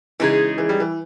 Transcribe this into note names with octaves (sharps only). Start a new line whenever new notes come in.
C#3 E3 G#3 D#4 G#4
E3
G3
E3